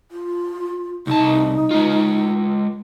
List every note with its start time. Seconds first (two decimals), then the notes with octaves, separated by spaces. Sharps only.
0.11 F4
1.07 C2 D#4 A5
1.71 G#3 F4